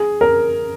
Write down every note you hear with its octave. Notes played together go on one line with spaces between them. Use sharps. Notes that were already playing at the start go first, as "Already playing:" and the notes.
Already playing: G#4
A#4